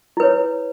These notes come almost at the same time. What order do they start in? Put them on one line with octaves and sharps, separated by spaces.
E4 B4 C#5